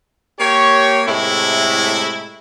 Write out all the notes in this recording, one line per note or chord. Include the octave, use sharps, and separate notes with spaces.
A#3 G4 C#5
A2 C3 G#3 A3 E4